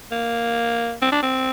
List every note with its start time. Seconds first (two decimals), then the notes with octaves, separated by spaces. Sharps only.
0.12 A#3
1.02 C4
1.12 D4
1.23 C4